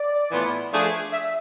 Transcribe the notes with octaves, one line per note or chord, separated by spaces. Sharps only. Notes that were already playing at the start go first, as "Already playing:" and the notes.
Already playing: D5
A2 E3 B3 F4
F3 A3 D4 G#4
E5